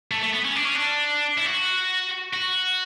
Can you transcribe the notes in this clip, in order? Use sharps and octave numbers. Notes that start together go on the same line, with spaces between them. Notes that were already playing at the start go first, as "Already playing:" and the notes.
A3
A3
B3
C#4
D4
C#4
D4
E4
F#4
F#4